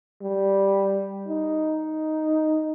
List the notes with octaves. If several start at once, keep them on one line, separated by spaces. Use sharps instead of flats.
G3
D#4